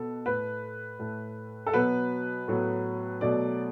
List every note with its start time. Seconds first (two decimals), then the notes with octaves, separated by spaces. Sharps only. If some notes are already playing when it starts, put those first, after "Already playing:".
Already playing: B2 B3 A4
0.26 A2 A3 B4
0.99 A2 A3
1.67 A4
1.73 B2 F#3 B3 B4
2.48 A2 F#3 B3
3.21 B2 F#3 A3 D5